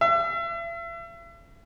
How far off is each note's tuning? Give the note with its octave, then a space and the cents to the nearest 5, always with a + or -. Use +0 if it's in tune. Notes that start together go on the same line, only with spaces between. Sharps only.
E5 +40